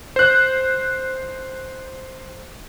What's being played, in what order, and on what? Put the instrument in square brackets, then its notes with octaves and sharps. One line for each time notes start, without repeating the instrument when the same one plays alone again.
[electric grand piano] C5 F#6